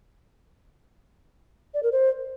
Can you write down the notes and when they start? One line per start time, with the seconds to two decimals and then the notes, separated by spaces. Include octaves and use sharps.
1.74 D5
1.83 A#4
1.92 C5